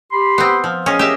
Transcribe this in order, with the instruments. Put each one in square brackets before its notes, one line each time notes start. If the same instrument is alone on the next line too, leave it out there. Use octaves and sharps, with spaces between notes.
[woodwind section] G4 B5 C6
[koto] B3 C4
F3
[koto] C#4 [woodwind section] G#4 A#4 D#5
[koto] G4 E5